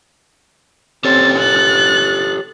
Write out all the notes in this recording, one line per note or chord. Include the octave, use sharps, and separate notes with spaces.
C4 G4 A4 C#5 A6
F#6 A6